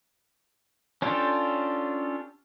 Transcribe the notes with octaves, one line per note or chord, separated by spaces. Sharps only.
C#4 D4 F4 G4 A4